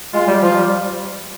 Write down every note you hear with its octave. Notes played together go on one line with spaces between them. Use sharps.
G#3 F4
G3
F3 F4
G3